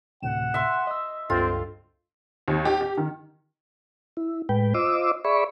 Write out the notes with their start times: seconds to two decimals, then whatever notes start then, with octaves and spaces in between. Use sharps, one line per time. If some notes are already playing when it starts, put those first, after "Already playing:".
0.22 D2 A2 C3 F#5 E7
0.54 E5 C6
0.87 D#5 E6
1.30 C#2 G2 C4 F4 A4
2.48 D#2
2.65 G4
2.81 G4
2.97 D#3
4.17 E4
4.49 A2 G#3 B4 G5
4.74 F4 C5 D#5 D6 E6
5.25 G#4 D5 E5 B5 C#6